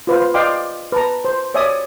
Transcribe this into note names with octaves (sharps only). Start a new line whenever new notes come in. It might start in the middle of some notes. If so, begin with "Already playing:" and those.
F4 B4 C5 F5
D5 D#5 F5 G5 C6 D6
B4 A5 A#5
C5
C#5 D5 E5 G#5 D#6